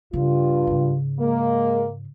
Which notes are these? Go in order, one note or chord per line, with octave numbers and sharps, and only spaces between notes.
G2 C#3 F4
G#2 C#3
G#3 A#3